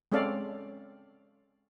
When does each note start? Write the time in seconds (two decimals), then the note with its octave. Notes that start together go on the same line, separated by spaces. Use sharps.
0.12 G#3 C4 C#4 A4 D5 F5